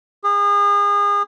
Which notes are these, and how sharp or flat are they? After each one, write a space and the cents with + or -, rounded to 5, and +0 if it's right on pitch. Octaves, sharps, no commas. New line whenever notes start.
G#4 -35